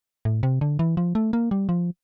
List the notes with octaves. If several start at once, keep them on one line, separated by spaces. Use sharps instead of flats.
A2
C3
D3
E3
F3
A3
A#3
G3
F3